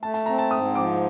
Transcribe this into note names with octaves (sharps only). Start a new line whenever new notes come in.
A3 A5
A5
C4 A#5
A5
G#2 D#6
F3 D6